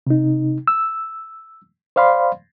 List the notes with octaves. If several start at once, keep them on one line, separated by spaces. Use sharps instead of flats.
C3 D#4
E6
C5 D5 F5 B5 C6